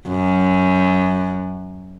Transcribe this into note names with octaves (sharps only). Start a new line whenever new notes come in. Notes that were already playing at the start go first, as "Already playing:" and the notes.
F#2